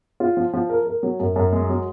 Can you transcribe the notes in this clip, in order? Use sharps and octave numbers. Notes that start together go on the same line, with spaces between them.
F4
F3
F3
A#4
A#4
F#3
F#2
F#2
G#3
F#3